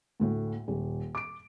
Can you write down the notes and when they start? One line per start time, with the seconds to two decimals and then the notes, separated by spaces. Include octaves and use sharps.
0.20 D2 A2
0.68 D#1
1.15 D6 D7